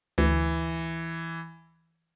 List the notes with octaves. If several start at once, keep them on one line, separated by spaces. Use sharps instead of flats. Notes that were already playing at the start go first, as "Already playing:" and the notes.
D2 E3